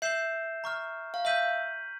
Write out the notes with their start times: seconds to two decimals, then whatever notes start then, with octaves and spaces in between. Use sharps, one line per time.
0.02 E5 G6 C7 E7 G7
0.64 A#5 C#6 F6
1.14 F5
1.25 E5 G6 B6 D#7 F#7